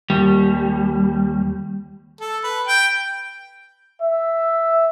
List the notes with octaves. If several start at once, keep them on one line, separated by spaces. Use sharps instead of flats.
D#2 G3
A4
B4
G5
E5